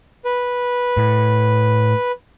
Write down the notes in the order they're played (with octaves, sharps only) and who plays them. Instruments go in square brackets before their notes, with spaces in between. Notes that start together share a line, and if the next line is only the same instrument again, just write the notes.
[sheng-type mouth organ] B4
[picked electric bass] A2